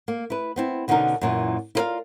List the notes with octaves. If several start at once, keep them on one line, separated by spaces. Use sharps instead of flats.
A#3
E4 B4
B3 C4 E4
B2 D3 B3 C#4 D#4 A#4
F#2 A#2 E3
E4 F4 A#4 C5 D5 F5